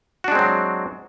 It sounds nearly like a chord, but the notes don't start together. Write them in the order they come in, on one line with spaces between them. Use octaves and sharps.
F#4 D4 G#3 C4 F#3